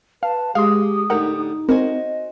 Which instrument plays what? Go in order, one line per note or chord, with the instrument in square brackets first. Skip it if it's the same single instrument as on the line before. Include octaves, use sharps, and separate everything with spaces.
[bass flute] B4 [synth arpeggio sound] F5 [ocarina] A5
[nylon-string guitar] G#3 [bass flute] G4 [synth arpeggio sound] F5 C6 [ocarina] D#6
[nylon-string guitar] A2 D3 G4 [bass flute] D#4 [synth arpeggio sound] A#4 F#5
[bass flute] D#4
[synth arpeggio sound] C4 A#4 [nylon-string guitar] F#4 C5 G#5 [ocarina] D#5